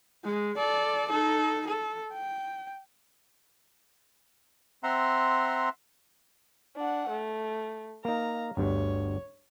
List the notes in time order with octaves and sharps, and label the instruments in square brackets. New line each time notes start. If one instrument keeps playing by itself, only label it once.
[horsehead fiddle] G#3
A4 D5
D#4 A4
A4
G5
[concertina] C4 E5 F#5 A#5 C6
[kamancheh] D4 F#5
A3
[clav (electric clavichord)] A#3 D#4 [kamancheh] F5 A#5
[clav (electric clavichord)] G1 D2 G2 [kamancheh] C#5